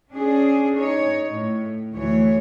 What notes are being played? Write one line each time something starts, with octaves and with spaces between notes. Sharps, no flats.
C#4 D4 G#4
D#4 C#5
A2
D2 E3 C#5